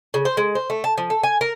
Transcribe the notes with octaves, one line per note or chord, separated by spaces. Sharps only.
C#3
C5
G#3
C5
A3
A5
F3
A4
G#5
A#4